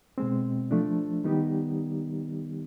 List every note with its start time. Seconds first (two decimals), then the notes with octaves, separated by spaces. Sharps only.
0.18 B2 G#3 C4
0.71 F3 A3 D4
1.24 D#3 G3 B3 D#4 G4